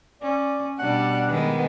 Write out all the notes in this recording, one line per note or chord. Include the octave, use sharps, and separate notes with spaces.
C#4 D5
B2 G3 D4 F#5
D#3 G#3 B3